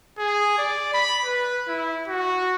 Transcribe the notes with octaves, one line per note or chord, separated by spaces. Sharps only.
G#4
D5
B5
B4
E4
F#4